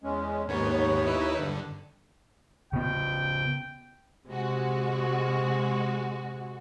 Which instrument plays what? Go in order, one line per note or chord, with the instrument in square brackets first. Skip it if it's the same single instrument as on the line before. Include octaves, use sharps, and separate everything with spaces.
[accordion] E2 G#3 C#4
[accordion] D#2 C#5 [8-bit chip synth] G#2 D#3 B3
[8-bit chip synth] D#4 E4 B4
G2 D3
[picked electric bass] C#3 B3 [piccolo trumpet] G5
[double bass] C3 [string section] G#3 F#4